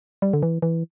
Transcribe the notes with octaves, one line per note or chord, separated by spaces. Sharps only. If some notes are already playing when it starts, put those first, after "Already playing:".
G3
D3
E3
E3